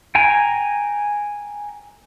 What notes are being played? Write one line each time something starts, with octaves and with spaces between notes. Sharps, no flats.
G5 G#5 A#5